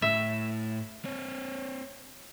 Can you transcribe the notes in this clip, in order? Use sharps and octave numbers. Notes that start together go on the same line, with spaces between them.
A2 E5
C4 C#5